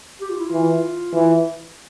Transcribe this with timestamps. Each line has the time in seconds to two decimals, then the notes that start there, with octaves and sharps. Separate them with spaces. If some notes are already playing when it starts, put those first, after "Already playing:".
0.21 G4
0.29 F4
0.37 E4
0.46 F4
0.52 E3
1.13 E3